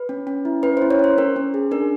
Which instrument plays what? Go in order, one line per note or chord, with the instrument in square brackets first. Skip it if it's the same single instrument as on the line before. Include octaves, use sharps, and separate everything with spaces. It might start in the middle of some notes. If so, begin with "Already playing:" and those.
Already playing: [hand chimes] B4
C#4
C#4
E4
C#4 B4
E4 C5
C#5
C#4 C5
C#4 A#4
C#4
G#4
D4 A#4